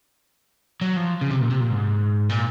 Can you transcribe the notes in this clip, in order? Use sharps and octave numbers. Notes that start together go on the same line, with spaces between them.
F#3
F3
C#3
C3
A#2
C3
A#2
G#2
A#2